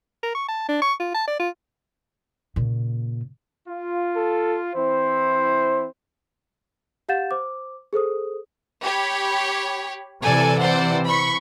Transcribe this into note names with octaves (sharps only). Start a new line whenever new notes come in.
A#4
C#6
A5
D4
C#6
F4
A5
D5
F4
A#2 C#3
F4
A4
E3 C4 E4 C5
G4 F5 F#5 G6 A6 E7
C5 D6
G#4 A4 C5 D#6
G4 C#5 B5
C3 E3 A4 D5 G#5
C5 D5 F#5
B5 C#6